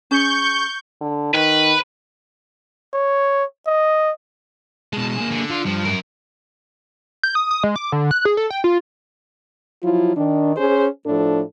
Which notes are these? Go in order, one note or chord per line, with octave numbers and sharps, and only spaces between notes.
C#4 G#4 C#6 G6
D3
D#3 B4
C#5
D#5
B2 G#3 A5
A#3 G#4
D3
F4
G2 F3
F#2 A#4
G6
D#6
D#6
G#3
D6
D3
F#6
G#4
A4
G5
F4
F3 F#3 E4 F4
D#3 D4
C#4 G#4 C5
A2 F3 D4 A4